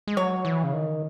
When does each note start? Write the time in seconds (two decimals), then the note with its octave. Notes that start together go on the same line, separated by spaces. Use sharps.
0.07 G#3
0.17 F#3 C#5
0.45 E3
0.64 C#3
0.73 D#3